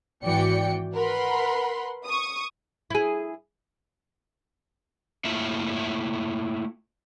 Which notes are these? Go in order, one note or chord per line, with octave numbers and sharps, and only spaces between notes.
G#1 E3 F#4 D5 G5 C#7
A#4 B4 F#5 B5 C6
C#6 D#6
E4 G#4
A3 A#3 E4 F4 E5